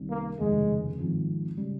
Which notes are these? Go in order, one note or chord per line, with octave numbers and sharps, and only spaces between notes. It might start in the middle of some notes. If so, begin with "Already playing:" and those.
Already playing: C2 C3 D#3 G3 C#4
A#3
F1 D#2 C#3 G#3
G#1 G#2 F3 C4
C#3 G3 C#4